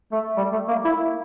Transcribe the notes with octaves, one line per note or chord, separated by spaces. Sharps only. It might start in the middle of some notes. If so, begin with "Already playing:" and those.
A3
G3
A3
A#3
E4